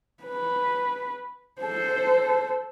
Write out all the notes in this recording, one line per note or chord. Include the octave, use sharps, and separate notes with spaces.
B4
A4 C5